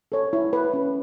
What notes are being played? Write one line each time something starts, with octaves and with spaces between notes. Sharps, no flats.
A4 C#5
E4
B4
C#4